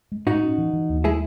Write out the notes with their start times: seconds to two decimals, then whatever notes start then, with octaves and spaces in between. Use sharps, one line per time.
0.12 G#3
0.26 A2 D#4 F#4
0.42 C#4
0.58 E3
0.73 E3
0.89 D#2
1.04 G#3 E4 G#4